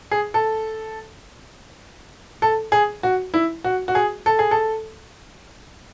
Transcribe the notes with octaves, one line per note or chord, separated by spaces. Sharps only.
G#4
A4
A4
G#4
F#4
E4
F#4
F#4
G#4
A4
G#4
A4